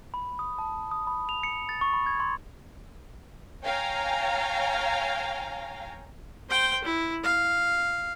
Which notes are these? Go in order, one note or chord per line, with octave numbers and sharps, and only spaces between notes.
B5
D#6
A5
D#6
B5
F7
C#7
A6
C#6
B5
G#6
C6
C#5 F5 G5 G#5 A#5
C5 G5
E4
F5